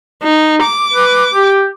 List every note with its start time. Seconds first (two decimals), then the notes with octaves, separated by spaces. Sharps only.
0.23 D#4
0.63 D6
0.93 B4
1.34 G4